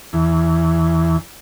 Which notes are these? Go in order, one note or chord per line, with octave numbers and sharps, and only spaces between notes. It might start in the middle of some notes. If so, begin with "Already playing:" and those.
E2